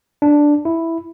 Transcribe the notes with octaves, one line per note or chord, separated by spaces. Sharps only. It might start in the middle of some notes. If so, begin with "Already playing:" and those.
D4
E4